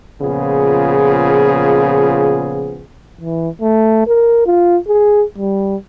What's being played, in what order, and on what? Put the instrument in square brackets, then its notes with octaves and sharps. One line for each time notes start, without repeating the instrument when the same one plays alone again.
[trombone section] A#2 C#3 F3 B3 G#4
[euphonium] E3
A3
A#4
F4
G#4
G3